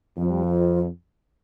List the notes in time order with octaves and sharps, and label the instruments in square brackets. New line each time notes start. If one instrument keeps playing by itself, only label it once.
[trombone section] F2 [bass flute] F3
[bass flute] G3
F3